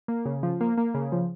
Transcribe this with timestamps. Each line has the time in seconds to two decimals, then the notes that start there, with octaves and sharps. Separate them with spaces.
0.08 A#3
0.25 C#3
0.43 F3
0.61 A#3
0.77 A#3
0.94 C#3
1.12 F3